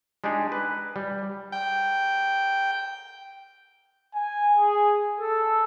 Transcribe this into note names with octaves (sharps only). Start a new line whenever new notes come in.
G#3 D4 D#4 G4 G#4
B4
G3
G5
G#5
G#4
A4